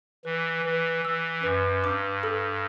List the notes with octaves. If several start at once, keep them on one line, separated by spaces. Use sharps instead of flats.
E3 B4
E3 B4
E3 E6
F#2 B4
G2 D6
A4